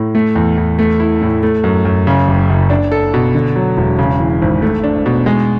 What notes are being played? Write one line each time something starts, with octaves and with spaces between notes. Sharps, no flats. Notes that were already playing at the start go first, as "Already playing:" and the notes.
Already playing: A2
A3
E2
E2
A3
E4
A2
A3
F#2
F#2
C#3
F#1
F#1
D4
A4
B2
D3
F#3
E1
C#3
E3
G#1
A3
D4
B2
G#3